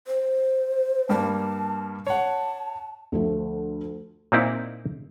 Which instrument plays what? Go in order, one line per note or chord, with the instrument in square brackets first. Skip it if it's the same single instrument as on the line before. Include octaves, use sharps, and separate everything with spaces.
[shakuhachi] C5
[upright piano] G2 G3 A#3 [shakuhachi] A5
[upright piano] C#5 F#5 [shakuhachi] A5
[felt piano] D2 F3 A3
[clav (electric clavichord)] A#2 A#3 C4 D#4 E4 D5